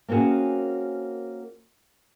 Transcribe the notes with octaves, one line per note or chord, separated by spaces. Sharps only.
A#3 C4 C#4 F#4 G#4